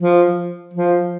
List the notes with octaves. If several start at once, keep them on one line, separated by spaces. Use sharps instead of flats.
F3
F3